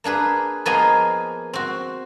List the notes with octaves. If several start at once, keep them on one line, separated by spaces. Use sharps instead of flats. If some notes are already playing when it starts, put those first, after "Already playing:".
A#3 D4 G#4 B4
F3 A#3 B3 G#4 D#5 G#5
C4 F#4